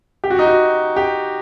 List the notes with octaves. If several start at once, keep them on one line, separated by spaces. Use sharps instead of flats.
G4
F#4
D#4
F#4
G4